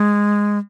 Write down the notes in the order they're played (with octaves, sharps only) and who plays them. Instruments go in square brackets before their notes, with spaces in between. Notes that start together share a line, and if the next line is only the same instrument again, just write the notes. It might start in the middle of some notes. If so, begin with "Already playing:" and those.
Already playing: [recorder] G#3